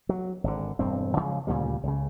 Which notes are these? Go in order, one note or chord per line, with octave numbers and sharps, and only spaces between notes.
F#3
G#1 D3
E1 G2 C4
C#3 F3 G#3
D2 A#2 C#3 G3
C#2 C#3